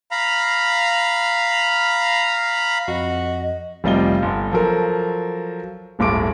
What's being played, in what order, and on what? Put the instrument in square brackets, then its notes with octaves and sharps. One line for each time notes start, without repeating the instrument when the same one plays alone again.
[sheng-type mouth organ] F5 A#5 B5
[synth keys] F2 [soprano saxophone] F#4 [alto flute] D#5
[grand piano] F1 C3 G3 F4 D#5 G7
G1
F3 F#3 A4 A#4
D1 G1 A2 D6 D7